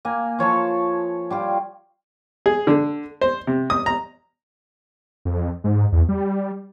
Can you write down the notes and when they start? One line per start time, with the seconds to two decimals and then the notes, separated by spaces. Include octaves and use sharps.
0.05 A#3 G#5
0.39 F3 C#5 A5 C#6
1.30 G3 F4 G4
2.46 G#4
2.67 D3
3.21 C5
3.47 C3
3.70 D#6
3.86 A#5
5.25 F2
5.64 G#2
5.92 E2
6.09 G3